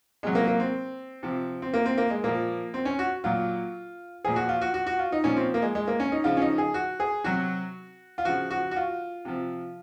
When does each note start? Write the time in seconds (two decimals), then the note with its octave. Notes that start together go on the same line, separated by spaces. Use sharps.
0.23 C3 F#3 G#3
0.35 A#3
0.47 A#3
0.60 C4
1.23 C3 F3
1.62 C4
1.74 A#3
1.86 C4
1.98 A#3
2.10 G#3
2.24 A#2 F3 A#3
2.74 C4
2.85 C#4
2.99 F#4
3.24 A#2 F#3 F4
4.25 A#2 F3 G#4
4.36 F#4
4.49 F4
4.61 F#4
4.74 F#4
4.87 F#4
4.99 F4
5.12 D#4
5.24 A#2 F3 C#4
5.37 C4
5.54 A#3
5.62 G#3
5.75 G#3
5.87 A#3
6.00 C#4
6.12 D#4
6.24 C#3 F3 F4
6.37 C#4
6.42 D#4
6.58 G#4
6.74 F#4
7.00 G#4
7.24 C3 F#3 F#4
8.18 F4
8.25 C#3 F3 F#4
8.51 F#4
8.71 F#4
8.76 F4
9.25 C3 F3